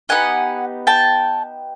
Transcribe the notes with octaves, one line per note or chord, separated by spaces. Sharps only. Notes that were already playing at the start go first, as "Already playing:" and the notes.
B3 D#4 G4 F#5 G#5
G5 A5